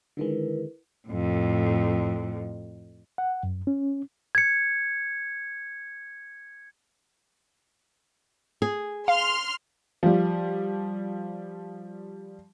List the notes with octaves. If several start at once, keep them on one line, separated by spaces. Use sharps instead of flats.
D3 D#3 G#3 E4 A#4 B4
F2 A2
F#5
F#2
C#4
G#6 C#7
G#4
F5 C6 F6
F3 G3